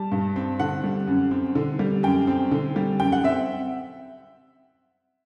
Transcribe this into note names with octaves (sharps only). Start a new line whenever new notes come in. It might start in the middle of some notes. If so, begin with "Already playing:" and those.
Already playing: G3 A5
G2
C4
D3 F#5
G3
F#2
C4
D3
G3
F#2 G5
C4
D3
G3
F#2 G5
F#5
C4 E5